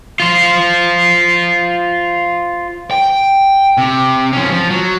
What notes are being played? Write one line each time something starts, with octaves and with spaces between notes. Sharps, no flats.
F4 C5
G5
C3
F3 C#4
F3
F#3